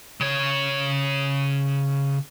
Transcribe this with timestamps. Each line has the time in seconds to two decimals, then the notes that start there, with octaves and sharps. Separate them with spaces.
0.20 C#3 C#5